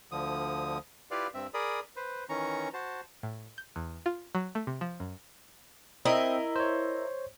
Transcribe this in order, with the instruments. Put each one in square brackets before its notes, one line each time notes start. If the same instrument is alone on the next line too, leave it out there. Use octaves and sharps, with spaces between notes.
[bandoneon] D2 D3 F3 D#6
E4 F4 G4 B4 D5 F5
G2 C4 E5
G#4 A#4 D5 B5 D#6
B4 C5
D#3 E3 C#4 A#5 C#6
F#4 C5 A5
[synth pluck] A2
G6
E2
F4
F#3
A3
C3
F3
F#2
[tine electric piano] C4 [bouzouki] E4 A#4 D#5
[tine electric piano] C5 C#5